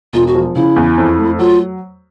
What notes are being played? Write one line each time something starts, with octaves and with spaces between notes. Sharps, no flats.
E1 F4
F#4
F3
C#3 E4
E2
F2
A3
F#3 F4